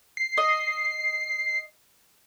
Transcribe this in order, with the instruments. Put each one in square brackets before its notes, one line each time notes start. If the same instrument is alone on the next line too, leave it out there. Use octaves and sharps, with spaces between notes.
[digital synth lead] C7
[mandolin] D#5